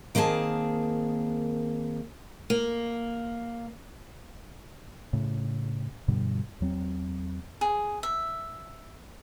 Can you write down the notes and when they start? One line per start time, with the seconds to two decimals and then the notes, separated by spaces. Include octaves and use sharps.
0.15 D#3 A#3 C4 G#4 A5
2.50 A#3
5.13 A2 C#3
6.08 G2 B2 D3 G3
6.60 E2 F#3 C4
7.61 G#4
8.03 E5